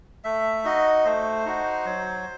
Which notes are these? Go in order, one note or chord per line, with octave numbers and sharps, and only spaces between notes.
A3 E5
D#4 F#4 D#5
A3 C5
D#4 F#4
F#3